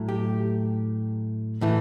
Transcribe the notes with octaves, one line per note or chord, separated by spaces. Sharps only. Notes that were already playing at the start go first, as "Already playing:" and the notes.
Already playing: A2 F#3 A3
G4
A2 E3 A3